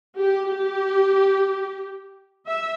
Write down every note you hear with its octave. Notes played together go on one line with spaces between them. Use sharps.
G4
G4
E5